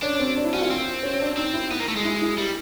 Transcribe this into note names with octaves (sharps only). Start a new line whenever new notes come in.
C#4 D4
C4
D4
E4
C#4 F#4
F4
C4
C#4
D4
C4 D#4
E4
B3
A#3
A3
G#3
E4
E4
G3